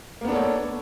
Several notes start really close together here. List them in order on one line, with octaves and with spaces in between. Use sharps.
A#3 B3 D4 A4 C#5